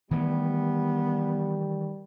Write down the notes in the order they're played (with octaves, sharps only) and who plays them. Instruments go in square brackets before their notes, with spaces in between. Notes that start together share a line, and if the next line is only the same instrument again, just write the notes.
[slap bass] D#3 E3 A3 [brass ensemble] G3 [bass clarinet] B3